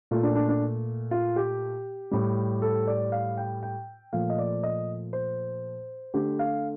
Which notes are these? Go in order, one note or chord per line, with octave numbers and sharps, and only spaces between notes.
A#2 A3 F4
D4
D4
D4
F4
G4
A2 G3
A4
D5
F5
G5
G5
A#2 F3 A3 F5
D#5
D5
D#5
C5
D3 A3 G4
F5